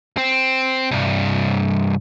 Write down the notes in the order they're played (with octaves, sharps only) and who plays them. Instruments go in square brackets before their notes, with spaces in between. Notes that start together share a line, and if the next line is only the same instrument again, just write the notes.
[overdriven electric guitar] C4
C2 G2